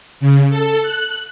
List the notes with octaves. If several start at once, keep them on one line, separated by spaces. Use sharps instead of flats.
C#3
A4
F#6